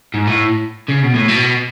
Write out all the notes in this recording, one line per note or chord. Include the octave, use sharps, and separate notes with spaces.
G#2
A2
C#3
B2
A2
B2